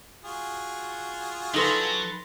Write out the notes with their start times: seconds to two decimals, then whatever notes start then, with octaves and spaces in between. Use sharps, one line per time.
0.25 F4 F#4 G#4
1.54 F#3 D#4 A4 B4 C6 A#6 F7